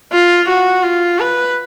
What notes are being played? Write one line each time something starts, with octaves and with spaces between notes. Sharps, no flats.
F4
F#4
F4
B4